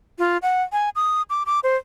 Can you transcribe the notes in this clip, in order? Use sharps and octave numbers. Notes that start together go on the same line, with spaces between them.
F4
F#5
G#5
D#6
D6
D6
C5